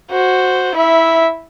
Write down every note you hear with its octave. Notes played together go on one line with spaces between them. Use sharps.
F#4 C5
E4 E5